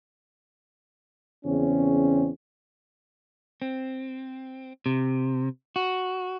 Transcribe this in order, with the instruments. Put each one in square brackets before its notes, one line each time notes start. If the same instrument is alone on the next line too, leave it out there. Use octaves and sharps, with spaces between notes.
[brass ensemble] E2 C#3 C4 C#4
[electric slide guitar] C4
C3
F#4